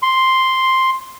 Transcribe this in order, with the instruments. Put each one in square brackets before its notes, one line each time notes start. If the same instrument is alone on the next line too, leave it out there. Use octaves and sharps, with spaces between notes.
[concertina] C6